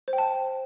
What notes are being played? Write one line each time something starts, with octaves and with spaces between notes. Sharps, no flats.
C5
G5
A5